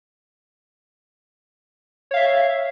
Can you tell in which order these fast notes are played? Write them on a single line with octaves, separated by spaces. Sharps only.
C#5 F5 E5